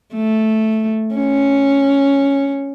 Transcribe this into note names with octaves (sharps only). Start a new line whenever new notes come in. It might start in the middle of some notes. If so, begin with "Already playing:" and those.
A3
C#4